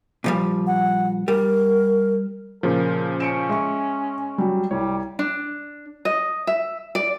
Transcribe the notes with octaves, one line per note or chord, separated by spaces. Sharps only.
A#2 F3 G3
F#5
G3 A#4
A#2 C#3 F3 A#4
C#4 C#7 D7 E7
G#3 E5 C#6
F#3 G3
C2 G3 C#5
D4
D#5
E5
D5